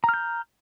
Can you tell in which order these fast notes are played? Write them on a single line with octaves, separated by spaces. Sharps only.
A#5 F6 G6